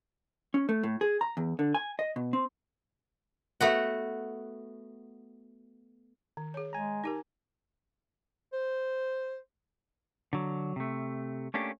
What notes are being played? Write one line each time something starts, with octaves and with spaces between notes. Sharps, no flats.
C#4
A3
A2
G#4
A#5
E2
D3
G#5
D#5
B2
C4
A3 B3 F#4
D#3
G#4 C#5
G#3 G#5 A#5
D#4 G4 A#4
C5
D3 F#3
C3 A3
A3 A#3 C#4 D4 G4